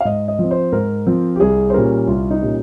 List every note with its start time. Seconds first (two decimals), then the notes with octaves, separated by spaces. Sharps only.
0.01 F5
0.05 G#2 D#5
0.28 D#5
0.39 F3 C4
0.51 C5
0.72 G#2 A#4
1.07 F3 C4
1.36 G4
1.40 C2 G#4
1.70 C5
1.74 A#2 G3 C#4 A#4
2.07 C2 F4
2.31 D#4
2.42 A#2 G3 C#4